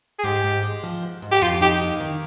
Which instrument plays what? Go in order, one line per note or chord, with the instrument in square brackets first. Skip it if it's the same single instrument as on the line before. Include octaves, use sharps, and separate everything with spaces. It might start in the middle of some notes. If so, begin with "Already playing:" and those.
[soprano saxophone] G#4
[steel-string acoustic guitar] G#2 [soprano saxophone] G4
[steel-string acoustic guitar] G#2
G#3
F3
G#2
G#2
[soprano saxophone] G4
[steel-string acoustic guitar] F2 [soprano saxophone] F4
[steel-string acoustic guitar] D#4 [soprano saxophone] G4
[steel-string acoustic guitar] A#3
D#3